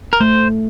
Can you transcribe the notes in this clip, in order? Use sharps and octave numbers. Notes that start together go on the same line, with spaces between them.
A#4
A3 C5